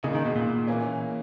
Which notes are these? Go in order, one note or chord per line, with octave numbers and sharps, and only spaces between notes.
A#2 C#3 G#3 D#4
D#3
B2
A#2
E3 A#3 C#4